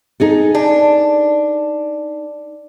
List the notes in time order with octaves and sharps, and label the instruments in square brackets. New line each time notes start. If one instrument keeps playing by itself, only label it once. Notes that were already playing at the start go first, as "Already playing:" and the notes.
[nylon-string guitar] D#4 G#4 A4
[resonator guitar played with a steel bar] D4